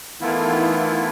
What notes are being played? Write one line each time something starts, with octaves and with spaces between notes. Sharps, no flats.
D#3 E3 A3 B3 E4 F4